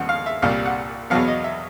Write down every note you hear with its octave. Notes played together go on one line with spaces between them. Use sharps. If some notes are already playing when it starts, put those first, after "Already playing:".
Already playing: D#2 C#3 F3 G#3 B3 F#5
F5
E5
C2 A#2 G3 F5
F#5
E2 B2 F#3 B3 F5
D#5
E5